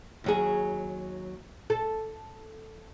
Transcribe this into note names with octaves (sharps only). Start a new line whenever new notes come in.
D#2 F#3 G#4
A4